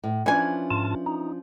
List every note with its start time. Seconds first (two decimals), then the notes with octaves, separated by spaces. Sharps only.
0.04 A2
0.26 E3 F3 C#4 D4 G#5
0.70 G#2 F4 A5
1.06 D#4